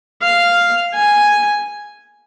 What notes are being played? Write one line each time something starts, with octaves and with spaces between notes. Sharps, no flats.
F5
G#5